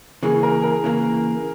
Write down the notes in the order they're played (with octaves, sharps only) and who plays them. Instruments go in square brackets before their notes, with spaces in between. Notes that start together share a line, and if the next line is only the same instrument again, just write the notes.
[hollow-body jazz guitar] C#3 E3 A#3 [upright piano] G#4
[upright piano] A#4
A#4
[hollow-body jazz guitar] C#3 E3 A#3